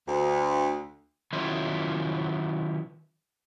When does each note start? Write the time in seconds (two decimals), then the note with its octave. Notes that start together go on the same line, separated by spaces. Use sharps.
0.06 D2
1.33 D#3 F#3 C#4 E4 F4